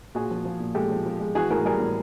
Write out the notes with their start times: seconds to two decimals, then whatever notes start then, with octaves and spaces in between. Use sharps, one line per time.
0.15 A#2 F#4 G#4
0.31 F3
0.45 F3
0.60 A#2
0.75 G#3 G4 A4
0.91 F3
1.06 F3
1.20 G#3
1.35 E3 F#4 G#4
1.50 A2 G#4 A#4
1.65 G3 G#4 A#4
1.80 A2